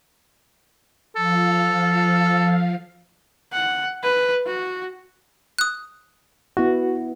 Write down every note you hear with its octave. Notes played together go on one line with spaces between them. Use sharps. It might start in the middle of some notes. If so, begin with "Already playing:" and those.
F3 A4 F5
F#5
B4
F#4
D#6 F#6
B3 E4 F#4